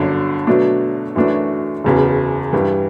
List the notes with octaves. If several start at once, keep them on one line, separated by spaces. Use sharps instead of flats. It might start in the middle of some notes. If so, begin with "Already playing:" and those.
Already playing: G1 F#2 D3 F#3
B2 F#3 A3 D4
F#2 E3 A3 D4 F#4
F#1 E2 C#3 F#3
G2 E3 G3